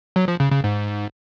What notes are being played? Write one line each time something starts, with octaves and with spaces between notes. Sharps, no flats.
F#3
F3
C#3
C#3
G#2